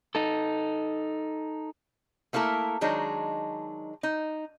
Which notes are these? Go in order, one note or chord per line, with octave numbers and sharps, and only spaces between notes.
D#4 A4
A3 A#3 E4 A4 A#4
D#3 F#3 G#3 D4 D#4
D#4